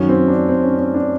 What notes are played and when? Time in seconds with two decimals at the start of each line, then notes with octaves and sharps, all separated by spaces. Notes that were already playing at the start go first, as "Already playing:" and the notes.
Already playing: F#2 D#3 F#3 C#4
0.09 C4
0.28 D4
0.49 C4
0.63 C#4
0.78 C#4
0.94 D4